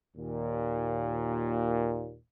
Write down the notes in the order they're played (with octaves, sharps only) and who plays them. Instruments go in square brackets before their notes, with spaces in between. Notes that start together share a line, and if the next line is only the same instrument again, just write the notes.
[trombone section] D#2 A#2